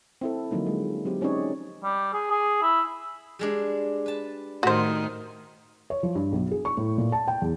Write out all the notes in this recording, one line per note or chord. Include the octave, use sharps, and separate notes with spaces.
C4 E4 A4
D3 F3 F#3 A#3 D#4
G#3
F#3 C4 G4
C4 C#4 D#4 G#4 C#5 D5
G3
G#4
G#4
E4
G3 G#3 D4
B4 A5
A2 D#3 F#4 C5
C#5
F3
G2
B1
G#4
C#6
A2
A#2
A5
G5
E2